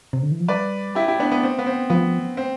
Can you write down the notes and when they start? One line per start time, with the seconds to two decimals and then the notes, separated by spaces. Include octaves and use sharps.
0.13 C3
0.23 D3
0.32 E3
0.40 F3
0.48 G3 B4 D5
0.95 E4 G4
1.08 E4 G4
1.19 B3 D4
1.31 B3
1.43 C4
1.58 B3
1.66 C4
1.90 F3 B3
2.37 C4